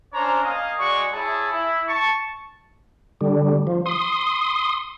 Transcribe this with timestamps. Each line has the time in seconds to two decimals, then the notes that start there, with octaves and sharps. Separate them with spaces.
0.13 C#4 D4 C5 C#5 A#5
0.43 A#3 D#5 F5 G#5 D#6
0.79 G#3 F#4 D5 C#6
1.13 E4 G#4 C#5 A5
1.51 E4
1.88 A5 C#6
3.21 D3 G3
3.67 F3
3.86 C6 D#6